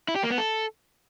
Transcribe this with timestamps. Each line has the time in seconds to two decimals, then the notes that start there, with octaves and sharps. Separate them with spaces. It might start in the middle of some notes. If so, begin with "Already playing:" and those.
0.08 E4
0.16 G4
0.23 A#3
0.31 B3
0.38 A4